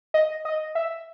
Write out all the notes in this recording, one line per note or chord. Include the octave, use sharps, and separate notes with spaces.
D#5
D#5
E5